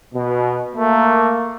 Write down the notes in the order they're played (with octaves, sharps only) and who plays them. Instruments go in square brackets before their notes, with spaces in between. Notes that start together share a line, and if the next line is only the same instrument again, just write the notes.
[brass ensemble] B2
[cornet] A3 [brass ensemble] A#3